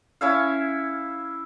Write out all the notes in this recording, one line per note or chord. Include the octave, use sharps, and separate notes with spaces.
C#4 E4 C#5 F5